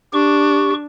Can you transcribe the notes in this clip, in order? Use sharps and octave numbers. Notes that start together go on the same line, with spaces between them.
D4 G4 C#6